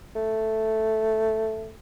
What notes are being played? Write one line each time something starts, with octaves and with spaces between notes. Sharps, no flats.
A3